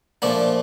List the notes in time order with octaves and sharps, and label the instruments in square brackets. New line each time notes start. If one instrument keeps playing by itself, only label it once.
[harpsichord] A#2 F3 A3 D4